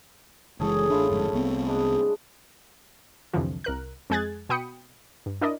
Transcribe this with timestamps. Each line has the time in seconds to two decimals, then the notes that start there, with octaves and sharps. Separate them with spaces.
0.60 F#1 E3 G#3 C#4 G#4 A4
0.90 A1 A3 D4 E4 F4
1.10 G1 F2 G#2
1.33 C2 B3 C4
1.66 G#3 D4
3.33 C2 F2 D3 E3 F3
3.64 C2 A#4 F#6
4.10 F2 G#3 G#4 F#6 G#6 A6
4.49 B2 F#4 G5 B5 D#6 C#7
5.26 G2
5.41 D4 E4 A#4 D5 D#5